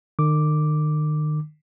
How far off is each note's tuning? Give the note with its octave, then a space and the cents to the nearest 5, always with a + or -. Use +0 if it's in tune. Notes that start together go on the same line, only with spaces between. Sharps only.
D#3 -40 D6 +0